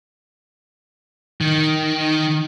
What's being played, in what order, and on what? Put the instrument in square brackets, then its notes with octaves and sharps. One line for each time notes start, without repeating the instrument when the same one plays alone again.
[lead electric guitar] D#3